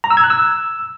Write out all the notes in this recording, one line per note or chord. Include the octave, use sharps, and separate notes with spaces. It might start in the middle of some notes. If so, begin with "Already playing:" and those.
A#5
E6
G#6
F#6
E6